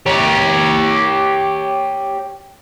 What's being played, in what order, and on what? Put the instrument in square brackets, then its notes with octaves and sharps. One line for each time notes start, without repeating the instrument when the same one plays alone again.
[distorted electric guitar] G4 C#5